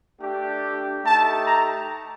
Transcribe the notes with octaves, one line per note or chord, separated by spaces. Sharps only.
A3 D4 G4
A3 D#4 G4 A5
A#5